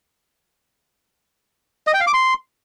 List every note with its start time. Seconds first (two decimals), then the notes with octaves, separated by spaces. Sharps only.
1.87 D#5
1.94 G5
2.00 F5
2.07 D6
2.14 C6